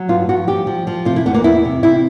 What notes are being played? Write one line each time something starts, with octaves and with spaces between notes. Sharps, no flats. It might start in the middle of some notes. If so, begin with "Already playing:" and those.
Already playing: F#3
G2 F4
F3 F#4
F3 G4
F3
F3
C3 F4
E4
E2 B3
A#3
E2 E4
C3
C3 E4